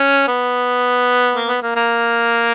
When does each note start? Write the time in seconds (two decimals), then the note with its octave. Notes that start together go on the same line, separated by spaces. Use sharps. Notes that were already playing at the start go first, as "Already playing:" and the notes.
Already playing: C#4
0.28 B3
1.35 A#3
1.48 B3
1.62 A#3
1.76 A#3